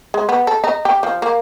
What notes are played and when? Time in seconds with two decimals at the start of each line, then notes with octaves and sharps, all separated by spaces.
0.14 G#3
0.29 B3
0.47 A4
0.64 D#4
0.85 G4
1.03 F3
1.22 A#3